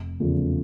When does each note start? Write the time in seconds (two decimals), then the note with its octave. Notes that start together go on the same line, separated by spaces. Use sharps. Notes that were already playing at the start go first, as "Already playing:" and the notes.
Already playing: F1
0.20 E2 C#3 F3 A3